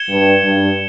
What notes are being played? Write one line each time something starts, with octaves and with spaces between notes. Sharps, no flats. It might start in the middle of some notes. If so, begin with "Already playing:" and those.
Already playing: G#6 C#7 E7 G7
G2
G2